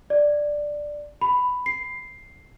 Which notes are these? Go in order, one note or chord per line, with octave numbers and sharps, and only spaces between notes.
D5
B5
C7